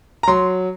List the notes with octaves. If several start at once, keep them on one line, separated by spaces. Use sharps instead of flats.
A#5
F#3 C6